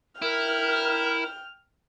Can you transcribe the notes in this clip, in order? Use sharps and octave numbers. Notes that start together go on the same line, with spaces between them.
E4 A#4 G5 F6